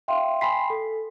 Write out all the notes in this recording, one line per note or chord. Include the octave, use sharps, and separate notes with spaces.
E5 F5 G5 C6
G5 G#5 B5 C6 B6 C7
A4